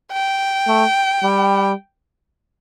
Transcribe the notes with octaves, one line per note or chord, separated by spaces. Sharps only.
G5
A3
G3